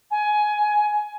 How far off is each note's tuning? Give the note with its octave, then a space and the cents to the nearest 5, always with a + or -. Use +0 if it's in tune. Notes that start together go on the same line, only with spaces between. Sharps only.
G#5 +15